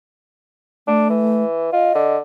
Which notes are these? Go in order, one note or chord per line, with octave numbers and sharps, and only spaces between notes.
A3 D4
E3
F4 D#5
D3